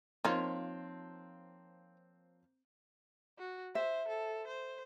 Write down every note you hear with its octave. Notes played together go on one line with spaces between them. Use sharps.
F3 A#3 C4 D#4 F4 C#5
F#4
C5 E5
A4
C5